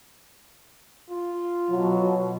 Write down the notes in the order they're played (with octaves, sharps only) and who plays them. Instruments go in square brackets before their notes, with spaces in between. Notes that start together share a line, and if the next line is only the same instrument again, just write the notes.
[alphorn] F4
[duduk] B2 [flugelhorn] F#3